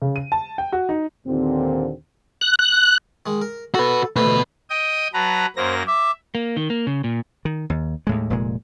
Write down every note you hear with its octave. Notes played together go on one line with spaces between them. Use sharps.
C#3
D#7
A5
G5
F#4
D#4
D#2 A#2 D3 C4
F#6
F#6
D#3 G#3
A#4
F#4 A4 B4
A1 D2 B2 A3 B4
D#5 G5 D#6
F#3 B4 A5 A#5
F#2 A#3 C5 A#6
E5 D6
A#3
D#3
A#3
C#3
A#2
D#3
D#2
D#2 A2 G#3
F1 A#2 G#3